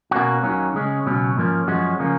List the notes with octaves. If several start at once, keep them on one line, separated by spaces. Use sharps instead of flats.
B2 A#3 C#4 F#4
D#2 D#3 F#3 A#3 C#4
C#3 G#3 C#4
C#2 B2 F#3 C#4
G#2 F3 A#3 C#4
F#2 F3 G#3 C#4 F#4
C#3 F3 A#3 C#4